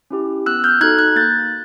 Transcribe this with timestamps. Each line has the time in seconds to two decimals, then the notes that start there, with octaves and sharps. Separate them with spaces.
0.11 C#4 E4 G4
0.46 B3 E6 F#6
0.64 F6 G6
0.81 D#4 F#4 A4 F#6 G#6
0.98 F#6 G#6
1.16 A#3 G6 A6